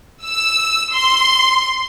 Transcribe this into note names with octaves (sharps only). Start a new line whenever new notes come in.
E6
C6